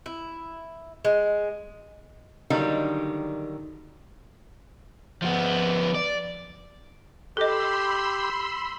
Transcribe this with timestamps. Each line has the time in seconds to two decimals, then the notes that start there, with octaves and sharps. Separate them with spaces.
0.06 E4
1.05 G#3
2.50 D3 D#3 F#3 G3 A#3 D#4
5.22 F3 B3
5.94 D5
7.37 G4 A4 D#5 B5 C6 E6